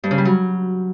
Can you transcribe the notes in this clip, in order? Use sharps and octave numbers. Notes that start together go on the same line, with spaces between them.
G2
C#3
G3
F#3